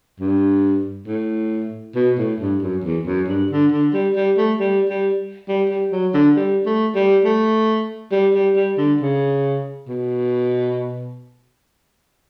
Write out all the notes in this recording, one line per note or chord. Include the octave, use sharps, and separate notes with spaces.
G2
A2
B2
A2
G2
F#2
E2
F#2
G2
D3
D3
G3
G3
A3
G3
G3
G3
G3
F#3
D3
G3
A3
G3
A3
G3
G3
G3
D3
C#3
B2